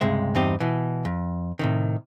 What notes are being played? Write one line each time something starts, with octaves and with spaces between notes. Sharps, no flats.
C#2 G2 C3 G#3 E5
E2 G2 C4 D#4 G4
B2 E3
F2
A2 C3 D#3